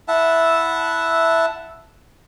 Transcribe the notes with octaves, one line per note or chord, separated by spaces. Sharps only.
E4 E5 F#5 A5